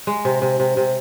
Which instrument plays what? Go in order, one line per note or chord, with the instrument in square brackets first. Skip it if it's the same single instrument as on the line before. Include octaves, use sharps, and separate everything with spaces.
[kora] G#3
C3
C3
C3
C3